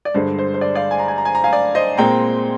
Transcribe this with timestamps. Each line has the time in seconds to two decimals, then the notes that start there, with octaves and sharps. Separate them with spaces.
0.05 D5
0.14 G2 D3 G#3 C5
0.38 C5
0.54 C5
0.61 D5
0.75 D5 F5
0.91 G#5
0.99 A#5
1.08 G#5
1.18 A#5
1.25 G#5
1.35 A#5
1.44 F5 G#5
1.53 D5
1.75 C5 D#5
1.98 A#2 G#3 C4 G5 A#5